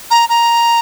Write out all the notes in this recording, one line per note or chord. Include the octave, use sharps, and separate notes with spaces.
A#5
A#5